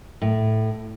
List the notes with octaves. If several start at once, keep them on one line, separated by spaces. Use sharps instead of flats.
A2